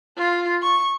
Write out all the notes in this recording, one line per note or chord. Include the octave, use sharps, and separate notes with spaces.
F4
C#6